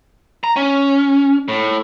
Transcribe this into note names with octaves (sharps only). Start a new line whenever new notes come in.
A#5
C#4
A2